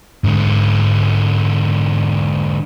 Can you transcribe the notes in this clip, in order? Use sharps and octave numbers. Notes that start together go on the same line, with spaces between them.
G#2 D3